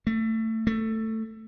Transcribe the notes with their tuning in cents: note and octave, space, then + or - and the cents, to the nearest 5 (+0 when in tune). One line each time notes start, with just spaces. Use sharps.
A3 +25
A3 +15